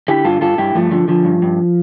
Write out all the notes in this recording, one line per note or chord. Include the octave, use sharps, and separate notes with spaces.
D3 E4 G4
G2 F4 A4
G2 F4 A4
G2 E4 G4
G2 F3 A3
D3 F3
D3 F3
G2
G2